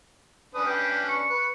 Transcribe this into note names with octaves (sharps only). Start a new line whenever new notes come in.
C#4 D4 B4 D#6
G5
C#6
B4